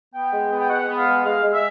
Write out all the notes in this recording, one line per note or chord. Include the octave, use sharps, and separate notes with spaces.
B3 G5
G#3
B3
G5
G#3 F#5
B3
F5
G#3
G#3 F5
G#3
E5